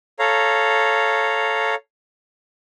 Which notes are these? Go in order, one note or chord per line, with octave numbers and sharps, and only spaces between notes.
A4 C#5 F5 A#5